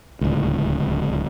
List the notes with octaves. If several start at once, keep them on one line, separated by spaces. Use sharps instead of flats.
D1 C#2